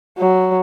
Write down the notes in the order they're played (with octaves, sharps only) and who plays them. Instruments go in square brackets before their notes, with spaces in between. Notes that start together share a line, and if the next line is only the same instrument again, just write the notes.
[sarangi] F#3